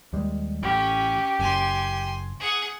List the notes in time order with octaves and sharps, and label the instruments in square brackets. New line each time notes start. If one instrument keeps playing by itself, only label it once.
[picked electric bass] D#2 G3 G#3
[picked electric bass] A1 A2 [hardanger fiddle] C#4 [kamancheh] G4
[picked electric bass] F#1 F#2 [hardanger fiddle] G#5 C6
[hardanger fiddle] G#4 F#5